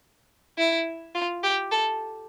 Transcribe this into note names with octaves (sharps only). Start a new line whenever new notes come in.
E4
F4
G4
A4